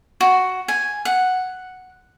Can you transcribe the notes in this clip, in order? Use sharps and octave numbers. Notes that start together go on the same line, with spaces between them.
F#4
G#5
F#5